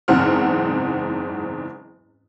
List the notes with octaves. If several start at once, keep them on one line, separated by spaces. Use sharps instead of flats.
F#1 E2 G#2 C4 F#5 F6